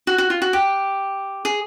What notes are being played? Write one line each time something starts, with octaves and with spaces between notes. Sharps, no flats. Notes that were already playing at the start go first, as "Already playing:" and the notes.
F#4
F#4
F4
F#4
G4
G#4